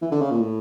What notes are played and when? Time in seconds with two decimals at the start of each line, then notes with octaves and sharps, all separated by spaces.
0.02 E3
0.12 D3
0.21 C#3
0.31 A#2
0.41 A2